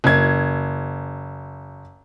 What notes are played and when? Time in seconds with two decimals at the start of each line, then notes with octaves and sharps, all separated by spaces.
0.04 F#1 G#6